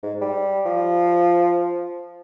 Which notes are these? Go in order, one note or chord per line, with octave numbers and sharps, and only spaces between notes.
G#2
G3
F3